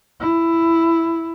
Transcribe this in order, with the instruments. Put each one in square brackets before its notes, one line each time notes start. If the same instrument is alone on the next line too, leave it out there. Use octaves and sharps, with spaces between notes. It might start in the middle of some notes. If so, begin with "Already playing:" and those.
[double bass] E4